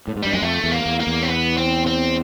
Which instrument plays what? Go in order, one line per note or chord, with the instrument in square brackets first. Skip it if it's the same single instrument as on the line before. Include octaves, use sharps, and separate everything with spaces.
[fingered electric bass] A2
G#2
[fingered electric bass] G2 [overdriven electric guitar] G3
[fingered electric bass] F#2 [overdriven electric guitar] G#3
[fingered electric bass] F2 [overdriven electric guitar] A3
[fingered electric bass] E2
[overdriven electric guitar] A#3
[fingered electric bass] E2
[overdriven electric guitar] A#3
[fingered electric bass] E2
[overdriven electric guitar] C4
B3
C4
C4